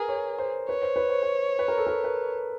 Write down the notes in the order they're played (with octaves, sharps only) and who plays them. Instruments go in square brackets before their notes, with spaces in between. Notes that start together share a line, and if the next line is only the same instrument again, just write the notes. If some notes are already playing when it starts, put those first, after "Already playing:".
Already playing: [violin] G#4 [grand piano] A#4 B4
[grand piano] C#5
C5
[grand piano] B4 [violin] C#5
[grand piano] C5
B4
C5
B4
B4
A#4
A4
A#4
B4